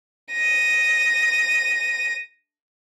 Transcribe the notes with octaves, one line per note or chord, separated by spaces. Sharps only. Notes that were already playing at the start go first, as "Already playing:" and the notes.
A#6 D#7